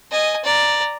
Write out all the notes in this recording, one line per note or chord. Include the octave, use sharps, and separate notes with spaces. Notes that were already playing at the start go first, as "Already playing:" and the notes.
D#5 G#5
D5 A#5